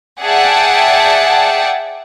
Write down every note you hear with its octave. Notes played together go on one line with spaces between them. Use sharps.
G#4 D5 E5 F#5 G5 A5